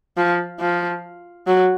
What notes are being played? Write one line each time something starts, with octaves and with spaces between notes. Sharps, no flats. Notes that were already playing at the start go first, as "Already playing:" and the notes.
F3
F3
F#3